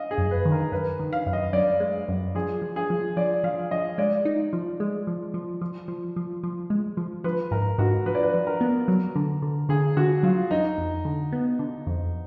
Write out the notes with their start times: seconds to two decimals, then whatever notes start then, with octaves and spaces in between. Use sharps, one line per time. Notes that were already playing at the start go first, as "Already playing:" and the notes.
Already playing: D#5 F5
0.11 G#4
0.18 F#2
0.31 B4
0.45 D#3
0.52 A#4
0.72 F#2 B4
0.99 D#3
1.13 F5
1.27 F#2
1.33 D#5
1.53 F#2 D5
1.80 G#3
2.09 F#2
2.35 F3 G#4
2.62 F3
2.76 G#4
2.90 F3
3.17 F3 D5
3.44 F3 F5
3.71 F3 D#5
3.98 G#3 D5
4.25 D#4
4.53 F3
4.80 G#3
5.07 F3
5.34 F3
5.61 F3
5.88 F3
6.16 F3
6.43 F3
6.70 G#3
6.97 F3
7.24 F3 B4
7.51 G#2 A#4
7.78 G#2 F#4
8.06 F3 B4
8.15 D5
8.23 B4
8.34 F3
8.47 A#4
8.61 B3
8.88 F#3
9.16 D3
9.42 D3
9.69 D3 G#4
9.97 D3 F#4
10.23 F#3 F4
10.51 F2 D#4
10.78 F2
11.05 D3
11.32 B3
11.59 D3
11.87 F2